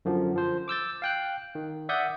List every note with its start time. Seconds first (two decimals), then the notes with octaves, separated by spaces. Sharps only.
0.05 F#2 D3 F3
0.36 F3 C5
0.68 D6 E6 G6 A6
1.02 F5 G5 F#6
1.55 D#3
1.89 D5 E5 F#5 D#6 G6 G#6